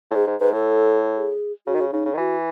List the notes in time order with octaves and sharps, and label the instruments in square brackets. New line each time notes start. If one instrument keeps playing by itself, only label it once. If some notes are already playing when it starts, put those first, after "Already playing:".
[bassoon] A2
[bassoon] G#2 [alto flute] G#4
[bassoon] G#2
[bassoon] G#2 [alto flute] B4
[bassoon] A2 [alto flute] A4
[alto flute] G#4
[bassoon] C#3 [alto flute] F#4
[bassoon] D#3
C#3
[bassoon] C#3 [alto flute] D#4
[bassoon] C#3
D#3
[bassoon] E3 [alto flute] F#4